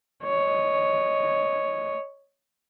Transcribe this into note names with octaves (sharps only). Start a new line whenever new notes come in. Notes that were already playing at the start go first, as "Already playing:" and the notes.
C#5 D#5